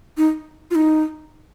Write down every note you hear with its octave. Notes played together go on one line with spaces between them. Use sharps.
D#4
F4
D#4